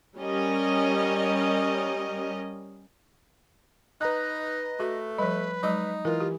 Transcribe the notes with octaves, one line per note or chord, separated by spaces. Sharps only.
G3 C#4 A#4 D#5
D#4 B4 D#5 A#5 F#6
A3 F#4
F3 G3 B4 B5
F#3 G#3 D#4
E3 F4 A#4
G4